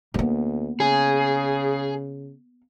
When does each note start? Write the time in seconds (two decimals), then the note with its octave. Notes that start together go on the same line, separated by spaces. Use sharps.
0.14 D2 A#3 B3
0.80 C#3 G#4